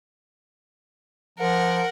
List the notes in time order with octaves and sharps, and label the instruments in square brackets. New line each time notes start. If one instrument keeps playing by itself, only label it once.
[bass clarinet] F3 [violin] A#4 F#5